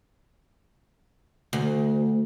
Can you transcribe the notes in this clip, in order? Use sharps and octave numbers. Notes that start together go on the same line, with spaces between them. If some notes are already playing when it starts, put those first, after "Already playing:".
D2